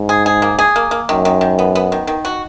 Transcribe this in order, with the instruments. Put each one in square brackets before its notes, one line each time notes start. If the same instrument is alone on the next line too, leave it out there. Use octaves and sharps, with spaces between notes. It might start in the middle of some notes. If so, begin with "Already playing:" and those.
Already playing: [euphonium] G#2
[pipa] G#4
G#4
A#3
G#4
A#3
A#3
[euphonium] F#2 [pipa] D#3
[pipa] D#3
D#3
B3
B3
D#3
D#3
F#4